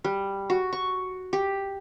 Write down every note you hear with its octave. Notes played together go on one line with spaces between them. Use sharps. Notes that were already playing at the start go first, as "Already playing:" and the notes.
G3
F#4
C#6
G4